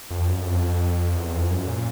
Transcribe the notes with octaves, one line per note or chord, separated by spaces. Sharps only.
F2
F#2
F2
E2
F2
F#2
A#2